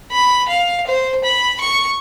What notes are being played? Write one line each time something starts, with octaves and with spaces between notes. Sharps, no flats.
B5
F5
C5
B5
C#6